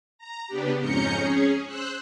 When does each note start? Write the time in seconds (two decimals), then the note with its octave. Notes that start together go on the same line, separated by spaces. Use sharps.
0.18 A#5
0.48 C#3 B3 D4 G4
0.80 F2 G#2 C#4 A#5 G6 C#7
1.15 C#4 G#4
1.66 C5 E6 F#6